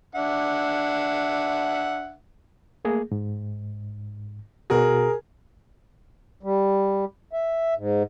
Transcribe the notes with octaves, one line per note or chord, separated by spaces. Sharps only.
D4 E5 F#5
A3 A#3 G#4
G#2
B2 F#4 G#4 A#4
G3
E5
G#2